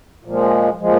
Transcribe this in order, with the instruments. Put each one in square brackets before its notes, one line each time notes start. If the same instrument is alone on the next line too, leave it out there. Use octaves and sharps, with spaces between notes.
[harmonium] A#2 F3 G#3
A#2 F3 G#3